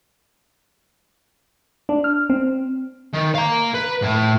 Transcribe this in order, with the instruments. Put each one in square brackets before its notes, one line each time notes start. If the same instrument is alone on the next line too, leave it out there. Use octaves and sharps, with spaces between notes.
[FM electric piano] D4
F6
C4
[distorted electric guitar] D#3
F5 A#5
B4
A2